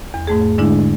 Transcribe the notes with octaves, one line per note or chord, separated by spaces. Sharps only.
E2
G#2 A3 G#4
G#2 D3 G#3 D4 E4